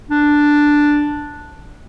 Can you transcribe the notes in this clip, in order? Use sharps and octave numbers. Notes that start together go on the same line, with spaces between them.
D4